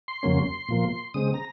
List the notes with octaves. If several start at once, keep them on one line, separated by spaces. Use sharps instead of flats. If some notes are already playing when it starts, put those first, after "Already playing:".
C6
F2 C#3 F#3 A#3 C#4
A#2 F3 A#3
C#3 G#3 C4 D#6
A#5